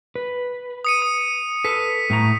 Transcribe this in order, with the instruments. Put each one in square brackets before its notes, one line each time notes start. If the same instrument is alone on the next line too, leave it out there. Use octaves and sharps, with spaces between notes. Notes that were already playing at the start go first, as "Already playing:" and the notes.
[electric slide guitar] B4
[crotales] D#6 C#7 D#7
D#6
[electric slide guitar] A4 B4 [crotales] B6
[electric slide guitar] A2 A3 A#5